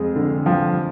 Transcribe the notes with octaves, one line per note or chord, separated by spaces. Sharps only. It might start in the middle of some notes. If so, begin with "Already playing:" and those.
Already playing: F2 G#3
D3
F3